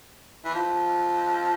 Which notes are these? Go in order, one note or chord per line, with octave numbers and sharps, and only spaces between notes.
E3
F3